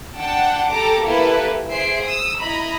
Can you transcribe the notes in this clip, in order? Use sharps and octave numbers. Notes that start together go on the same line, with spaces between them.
D4 F#5 G5 A5
G4 A4 A#5 D6
A#3 E4 G4 A4 B4
G#4 C5 E5 C7 D7
D#6 E6
E4 D#5 A#5 B5